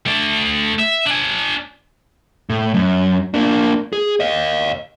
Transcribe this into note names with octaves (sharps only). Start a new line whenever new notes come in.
A3 D5
E5
D4 G#5
A2
F#2
A#3 D4
G#4
D#5 F5